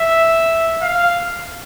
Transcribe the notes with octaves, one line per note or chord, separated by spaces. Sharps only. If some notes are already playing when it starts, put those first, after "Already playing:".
Already playing: E5
F5